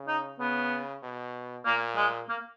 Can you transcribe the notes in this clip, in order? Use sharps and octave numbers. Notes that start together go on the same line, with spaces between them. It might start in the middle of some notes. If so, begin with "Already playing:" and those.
Already playing: C#3
D#4
C#3 B3
B2
A#2 A#3
G#3
A#3